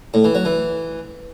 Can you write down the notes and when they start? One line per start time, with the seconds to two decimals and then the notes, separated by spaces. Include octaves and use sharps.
0.14 A2
0.24 E3
0.35 F#3
0.45 E3